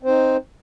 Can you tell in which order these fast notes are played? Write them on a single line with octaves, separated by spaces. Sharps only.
C4 C5 D#4